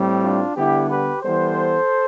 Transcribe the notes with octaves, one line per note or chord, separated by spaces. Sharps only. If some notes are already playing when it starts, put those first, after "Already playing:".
Already playing: A2 G3 C4
D4 F4
D3 G3 B3 E4 G4
G4 B4
E3 G3 B3 A4 C5